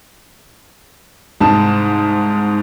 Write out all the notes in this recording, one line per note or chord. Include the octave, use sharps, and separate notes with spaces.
C2 G#2 A5